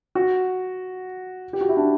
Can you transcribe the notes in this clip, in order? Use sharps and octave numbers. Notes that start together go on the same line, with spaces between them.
F#4
G4
F#4
E4
D4